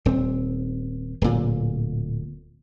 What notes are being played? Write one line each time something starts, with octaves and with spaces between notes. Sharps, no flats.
D#1 C4
D1 A#2